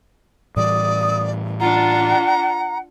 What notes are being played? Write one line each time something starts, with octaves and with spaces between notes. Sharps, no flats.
A2 E3 G3 D5 D#6
D4 F4 F#5 A#5